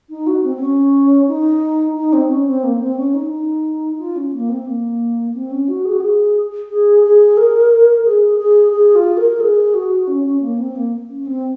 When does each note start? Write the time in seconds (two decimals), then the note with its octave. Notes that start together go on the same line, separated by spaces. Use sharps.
0.10 D#4
0.27 F#4
0.44 C4
0.56 C4
0.60 C#4
1.28 D#4
1.96 D#4
2.13 C4
2.30 C#4
2.47 C4
2.63 A#3
2.80 C4
2.97 C#4
3.14 D#4
3.31 D#4
3.98 F4
4.16 C#4
4.33 A#3
4.49 C4
4.66 A#3
5.34 C4
5.51 C#4
5.68 F#4
5.85 G#4
5.92 F#4
6.00 G#4
6.70 G#4
7.04 G#4
7.37 A#4
8.05 G#4
8.39 G#4
8.72 G#4
8.95 F4
9.17 A#4
9.40 G#4
9.74 F#4
10.07 C#4
10.25 C#4
10.41 A#3
10.58 C4
10.75 A#3
11.09 C#4
11.27 C4